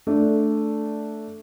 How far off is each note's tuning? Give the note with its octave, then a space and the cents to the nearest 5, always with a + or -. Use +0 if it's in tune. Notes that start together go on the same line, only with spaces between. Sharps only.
A3 +0 D4 +0 D5 -10